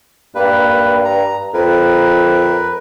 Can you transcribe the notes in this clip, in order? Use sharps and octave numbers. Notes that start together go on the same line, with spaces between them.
G2 A#3 B4
A#5
F2 A#4 B4